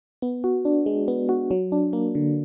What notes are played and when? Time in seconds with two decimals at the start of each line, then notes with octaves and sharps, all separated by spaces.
0.22 B3
0.44 F#4
0.65 D4
0.86 G#3
1.08 B3
1.29 F#4
1.51 F#3
1.72 D4
1.93 A#3
2.15 D3